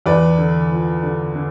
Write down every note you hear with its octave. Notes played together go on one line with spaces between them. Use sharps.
E2 B4 D5
D3
F3
D3
D3